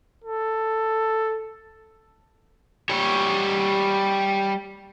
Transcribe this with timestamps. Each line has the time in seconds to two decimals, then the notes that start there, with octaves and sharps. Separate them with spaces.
0.24 A4
2.89 G3 C#5